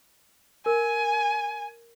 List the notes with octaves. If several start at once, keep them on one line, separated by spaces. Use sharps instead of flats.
A#4 G#5